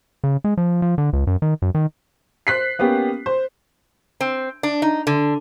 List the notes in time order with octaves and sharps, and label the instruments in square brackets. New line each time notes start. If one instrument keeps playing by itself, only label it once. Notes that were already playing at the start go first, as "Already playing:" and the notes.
[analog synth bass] C#3
G#3
F3
F3
D3
C#2
F#2
D#3
F#2
D#3
[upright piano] C5 F#6 B6 C7
A#3 B3 C#4 G4
C5
[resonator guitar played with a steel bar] C4
D4
D#4
D3